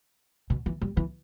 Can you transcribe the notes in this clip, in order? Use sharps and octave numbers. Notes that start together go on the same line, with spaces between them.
B2
E3
G3
E3